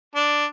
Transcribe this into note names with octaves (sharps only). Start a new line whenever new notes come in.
D4